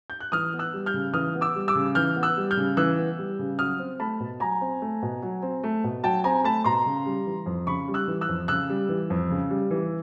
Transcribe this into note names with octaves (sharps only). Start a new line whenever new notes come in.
G6
F#6
E3 D#6 F6
B3
E6 F#6
G3
F6 G6
C#3
E3 D#6 F6
B3
D6 E6
G3
D6 E6
C#3
E3 F6 G6
B3
E6 F#6
G3
F6 G6
C#3
E3 E6 F#6
B3
G3
C#3
F#3 D#6 F6
C4
A3 A5 B5
B2
F#3 G#5 A#5
C4
A3
B2
F#3
C4
A3
B2
F#3 G5 A5
C4 G#5 A#5
A3 A5 B5
B2 A#5 C6
C#3
G3
E3
F2
C#3 B5 C#6
G3
E6 F#6
E3
E6 F#6
F2
C#3 E6 F#6
G3
E3
F2
C#3
G3
E3